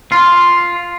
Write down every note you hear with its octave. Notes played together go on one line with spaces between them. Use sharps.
F4